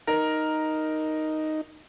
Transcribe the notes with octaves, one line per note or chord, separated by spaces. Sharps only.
D#4 A#4